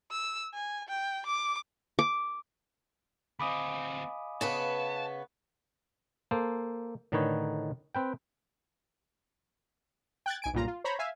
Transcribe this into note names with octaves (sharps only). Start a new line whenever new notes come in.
E6
G#5
G5
D6
D6
D2 C4 D#5 F5 G#5 B5 D6 D#6
C#3 B3 B4 A5
A#3 A4 C5
A2 D3 D#3 D#4 B4 C#5
C4 B4 G5
G5 F#6 G#6 A6
B1 G#5 D7
B1 G2 A#2 F4 A#5
F4
C5 C#5 A#5 B5
E5 F5 G#5